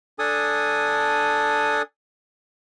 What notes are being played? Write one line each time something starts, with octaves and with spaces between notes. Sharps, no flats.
D4 A4 G#5 D#6